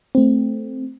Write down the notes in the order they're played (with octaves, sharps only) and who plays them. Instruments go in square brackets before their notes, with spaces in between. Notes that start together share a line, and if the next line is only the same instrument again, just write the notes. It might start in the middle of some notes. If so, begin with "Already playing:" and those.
[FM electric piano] A3 C4